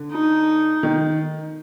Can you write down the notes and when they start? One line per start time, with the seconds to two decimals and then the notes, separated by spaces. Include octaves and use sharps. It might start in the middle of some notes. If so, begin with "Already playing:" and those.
Already playing: D3
0.11 D#4
0.83 D#3